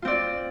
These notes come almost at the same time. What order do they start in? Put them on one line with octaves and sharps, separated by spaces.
F4 C4 D5